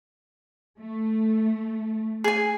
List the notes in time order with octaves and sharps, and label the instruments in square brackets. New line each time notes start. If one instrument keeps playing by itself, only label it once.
[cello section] A3
[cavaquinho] G#4 G#5